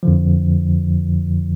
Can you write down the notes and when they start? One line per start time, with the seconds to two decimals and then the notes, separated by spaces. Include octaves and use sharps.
0.03 F2 D3 F3